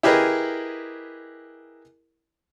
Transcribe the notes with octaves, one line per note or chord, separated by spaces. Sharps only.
E4 G4 G#4 A#4 B4 D#5